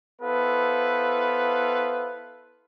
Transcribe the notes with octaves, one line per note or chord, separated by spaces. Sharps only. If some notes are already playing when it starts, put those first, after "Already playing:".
B3 E4 A4 B4 C5 F5